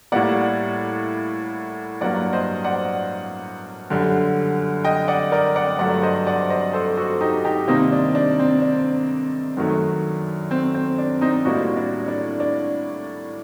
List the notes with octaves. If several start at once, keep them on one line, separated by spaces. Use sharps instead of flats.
A2 G3 A#3 D5 F#5
G2 F#3 A#3 D5 F#5
C5 D#5
D5 F#5
F#2 D3 G3
D#5 G5
D5 F#5
A#4 D5
D5 F#5
G2 F#3 A3 D5 F#5
C5 D#5
D5 F#5
C5 D#5
A4 C5
F#4 A4
D#4 G4
D#4 G4
C3 D#3 G3 A#3 C4 D#4
D4
D4
C4
D4
F#2 D#3 F#3 A3
C4
C4
D4
C4 D#4
A2 G3 A#3 D4 F#4
D4
D4
D4